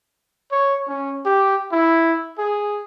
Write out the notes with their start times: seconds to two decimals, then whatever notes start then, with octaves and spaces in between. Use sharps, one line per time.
0.52 C#5
0.88 C#4
1.25 G4
1.72 E4
2.38 G#4